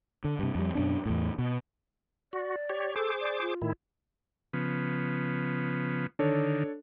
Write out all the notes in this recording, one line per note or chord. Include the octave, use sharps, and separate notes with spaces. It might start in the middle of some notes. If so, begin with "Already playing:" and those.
D3
G2 C3
F2 G3
F#2 B2 C#4 D4
E2 A2
B2
F#4 D5
G4 C#5
G#4 A4 C5 D6
D5
F4
A2 D#3 E4
C#3 F3 B3
D3 D#3 D4 A4 C#5